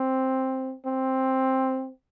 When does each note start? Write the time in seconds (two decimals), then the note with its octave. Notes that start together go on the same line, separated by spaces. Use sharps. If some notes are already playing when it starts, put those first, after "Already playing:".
Already playing: C4
0.86 C4